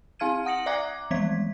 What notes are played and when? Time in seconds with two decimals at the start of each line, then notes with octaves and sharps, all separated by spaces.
0.19 C4 E4 F5 F6 G#6 D#7
0.45 F#5 D#6 A#6 C#7 F#7
0.66 D5 E5 A#5 D6 F#6 G#6
1.11 E3 F3 G3 G#3 G#6 B6